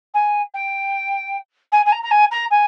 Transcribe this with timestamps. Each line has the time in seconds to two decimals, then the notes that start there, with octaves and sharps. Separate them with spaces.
0.14 G#5
0.54 G5
1.72 G#5
1.86 G#5
1.92 A#5
2.03 A#5
2.11 G#5
2.31 A#5
2.51 G#5